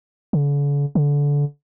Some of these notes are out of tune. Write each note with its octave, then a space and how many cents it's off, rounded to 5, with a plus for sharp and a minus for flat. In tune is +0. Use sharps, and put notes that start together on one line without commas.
D3 -45
D3 -25